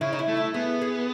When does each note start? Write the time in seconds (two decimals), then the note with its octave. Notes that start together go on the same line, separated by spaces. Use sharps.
0.01 C#3 E4
0.13 D#4
0.19 E4
0.28 A3
0.37 E4
0.54 B3 G#4
0.82 G#4